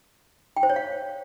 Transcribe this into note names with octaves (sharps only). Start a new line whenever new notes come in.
G5
C5
C#5
F5